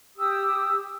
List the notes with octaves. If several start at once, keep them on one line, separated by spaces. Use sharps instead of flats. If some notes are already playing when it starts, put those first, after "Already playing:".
G4 D#6 E6